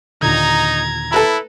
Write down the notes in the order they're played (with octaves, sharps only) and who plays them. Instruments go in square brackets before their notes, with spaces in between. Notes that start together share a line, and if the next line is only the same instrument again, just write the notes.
[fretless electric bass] D#2 A#2 D3 [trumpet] D#4 [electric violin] A#5 G#6
[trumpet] E4 [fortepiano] A4 B4 A#5